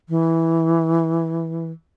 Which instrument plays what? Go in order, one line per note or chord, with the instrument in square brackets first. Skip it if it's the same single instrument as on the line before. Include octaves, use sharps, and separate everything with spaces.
[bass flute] E3